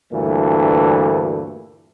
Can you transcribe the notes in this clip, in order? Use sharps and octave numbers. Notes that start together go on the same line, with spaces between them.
D2 G2 A#2 E3 A3